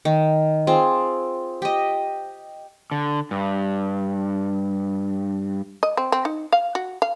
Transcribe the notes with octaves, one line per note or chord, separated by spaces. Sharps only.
D#3
C4 F4 G#4
G4 D#5
D3
G2
D#5
C4
C4
D#4
F5
F#4
F5